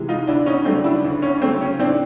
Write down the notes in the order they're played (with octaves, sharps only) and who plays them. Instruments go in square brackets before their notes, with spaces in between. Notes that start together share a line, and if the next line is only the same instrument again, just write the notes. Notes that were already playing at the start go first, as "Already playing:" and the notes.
Already playing: [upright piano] C3 E3 G#3
D#4 F4
D2 D4 E4
C#4 D#4
C#3 F#3 A3 C4 D4
D4 E4
D2
C#4
C#3 F#3 A3 C4
C#4
A2 C4 D4